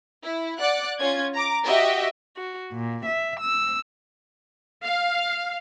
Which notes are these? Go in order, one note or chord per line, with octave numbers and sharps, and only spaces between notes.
E4
D5 F#5 F#6
C#4 F4 G#6
A#5 D6
F#4 G4 D#5 E5
F#4
A#2
E5
E6
F5